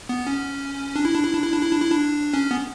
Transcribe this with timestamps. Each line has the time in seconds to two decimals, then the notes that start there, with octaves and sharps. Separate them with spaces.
0.09 B3
0.27 C#4
0.96 D4
1.05 E4
1.14 D4
1.24 E4
1.34 D4
1.43 E4
1.53 D4
1.62 E4
1.72 D4
1.82 E4
1.91 D4
2.34 C#4
2.51 B3